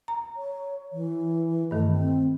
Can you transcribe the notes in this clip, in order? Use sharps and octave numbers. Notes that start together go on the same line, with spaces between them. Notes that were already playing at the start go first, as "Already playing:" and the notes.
A#5
C#5
E3
G2 D#3 A3
C4